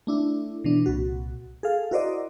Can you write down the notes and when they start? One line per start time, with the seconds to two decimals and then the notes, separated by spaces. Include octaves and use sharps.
0.07 A3 D4 E4
0.64 B2 E3 D4
0.86 C2 A#2 F#4
1.63 G#4 A4 F5
1.91 E4 F#4 A#4 C5 D5 D#5